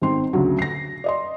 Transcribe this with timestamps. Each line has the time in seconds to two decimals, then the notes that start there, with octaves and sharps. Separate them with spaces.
0.02 G#1 G#2 C4 C6
0.33 D2 C#3 F#3
0.59 A#6 C7
1.04 D5 D#5 C6